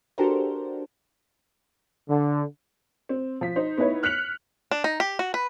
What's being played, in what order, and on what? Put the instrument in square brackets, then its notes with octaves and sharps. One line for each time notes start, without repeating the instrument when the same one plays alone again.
[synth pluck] D4 F#4 G4 A4 A#4 C5
[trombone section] D3
[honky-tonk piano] C4
F3 B6
D#4 C5
B3 D#4 E4 B4 C#5
F6 F#6 B6 C#7 F7 F#7
[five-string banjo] D4
D#4
G4
F#4
B4